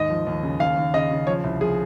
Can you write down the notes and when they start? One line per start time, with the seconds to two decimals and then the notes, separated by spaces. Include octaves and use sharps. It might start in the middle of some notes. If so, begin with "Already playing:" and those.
Already playing: D#2 G#2 D#5
0.10 F3
0.27 D#2
0.43 C#3
0.60 D#2 F5
0.77 D#2
0.94 C#3 D#5
1.11 C#3
1.27 F3 C#5
1.44 C2
1.61 F3 G#4